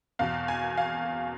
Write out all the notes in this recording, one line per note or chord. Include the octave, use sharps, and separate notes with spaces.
E2 B2 F5
G#5
F5